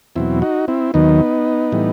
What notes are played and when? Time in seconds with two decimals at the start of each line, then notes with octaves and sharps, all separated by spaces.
0.16 E2 B2 F#3 C4 E4
0.42 D#4 F#4
0.68 C4 E4
0.94 D#2 D#3 F#3 B3 D#4
1.72 A2 E3 G3